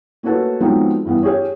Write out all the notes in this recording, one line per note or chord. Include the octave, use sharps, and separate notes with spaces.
A3 A#3 C#4 F#4 A4 B4
F3 F#3 G#3 B3 C4 D#4
G2 E3 B3
C#4 G4 G#4 C#5